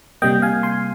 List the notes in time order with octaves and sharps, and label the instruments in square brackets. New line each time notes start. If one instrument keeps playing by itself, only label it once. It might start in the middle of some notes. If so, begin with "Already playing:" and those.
[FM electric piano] C3 G3 A#3 D#5 G5
F5 G#5
G#5 C6